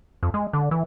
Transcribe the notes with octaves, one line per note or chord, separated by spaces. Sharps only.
F2
G#3
D3
E3